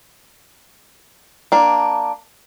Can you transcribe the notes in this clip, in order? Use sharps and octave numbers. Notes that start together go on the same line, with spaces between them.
A#3 D4